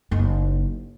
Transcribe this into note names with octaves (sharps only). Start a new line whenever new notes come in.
F#1 D#4